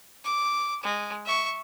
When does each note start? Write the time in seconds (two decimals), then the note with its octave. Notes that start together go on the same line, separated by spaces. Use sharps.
0.24 D6
0.83 G#3
1.26 E5 C#6